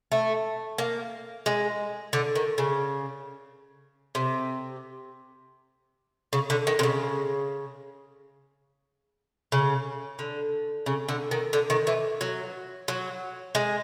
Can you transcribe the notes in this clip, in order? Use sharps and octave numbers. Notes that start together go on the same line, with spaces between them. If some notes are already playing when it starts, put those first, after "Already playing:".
A3
A#3
G#3
D3
D#3
C#3
C3
C#3
D3
D#3
C3
C#3
C#3
D3
C#3
D3
D#3
D3
D#3
E3
F#3
F#3
G#3